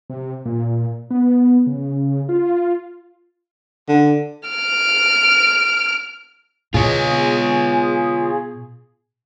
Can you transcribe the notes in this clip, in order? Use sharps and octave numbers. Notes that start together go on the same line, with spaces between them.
C3
A#2
B3
C#3
F4
D3
F6 D7
B2 F4 G#4 C#5